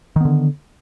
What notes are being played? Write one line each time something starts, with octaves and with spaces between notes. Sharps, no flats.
D3 D#3 B3